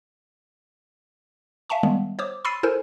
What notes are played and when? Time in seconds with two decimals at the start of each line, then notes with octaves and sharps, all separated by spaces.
1.70 E5 F5 G#5 A5 C#6
1.83 D#3 G3 G#3 B3
2.19 C5 C#5 D6 D#6
2.45 B5 C6 E6 A6 C7 D#7
2.63 E4 A4 A#4 C5 G#5